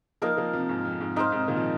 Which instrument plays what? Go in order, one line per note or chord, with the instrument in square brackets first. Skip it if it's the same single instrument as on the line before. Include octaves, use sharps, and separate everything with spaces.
[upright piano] F3 A#3 [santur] D#4 A#4 F5
[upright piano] F3 A#3
C3 F3
G#2
F2
G#2
[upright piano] G#2 [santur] D#4 C5 F5
[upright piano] G#2 C3
A#2 D#3
F3